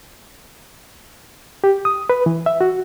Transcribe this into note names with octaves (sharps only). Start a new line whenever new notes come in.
G4
D#6
B4
E3
E5
F#4